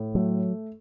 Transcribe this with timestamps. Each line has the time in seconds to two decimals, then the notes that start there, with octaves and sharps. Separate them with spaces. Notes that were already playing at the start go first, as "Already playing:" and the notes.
Already playing: A2
0.15 F#3 A3